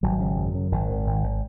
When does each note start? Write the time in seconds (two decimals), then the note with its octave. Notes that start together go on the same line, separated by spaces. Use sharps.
0.03 G#1 F#3
0.20 C#3
0.38 F#2
0.55 C#3
0.72 G#1 D#3
0.90 G#1
1.07 G#1
1.23 G#1